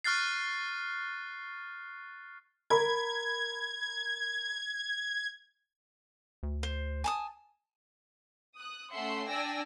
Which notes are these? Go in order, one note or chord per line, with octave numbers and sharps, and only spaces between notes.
C#6 F6 F#6 A6 C7
A#4 B5 G#6
D2
C5
G#5 A5 D#6
D#6 F#6
A3 C#4 E5 F#5 C6 C7
D4 D5 G5 G#5 E6 A#6